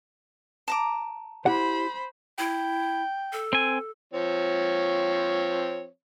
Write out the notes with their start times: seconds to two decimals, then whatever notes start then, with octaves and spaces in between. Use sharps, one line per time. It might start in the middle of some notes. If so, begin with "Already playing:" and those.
0.68 A5 A#5 D6
1.46 E4 G4 C5 F#5 B5
2.38 E4 G5
3.33 A4
3.53 C4 G#5
4.14 F3 C4 C#5